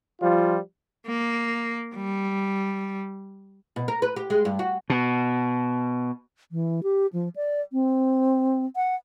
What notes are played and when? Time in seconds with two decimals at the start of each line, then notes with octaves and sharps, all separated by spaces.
0.22 F3 G3 F4
1.07 A#3
1.96 G3
3.76 B2
3.88 A#4
4.02 B4
4.16 G4
4.30 G#3
4.45 G2
4.59 F#4
4.90 B2
6.52 E3
6.83 G4
7.13 F3
7.36 D5
7.73 C4
8.76 F#5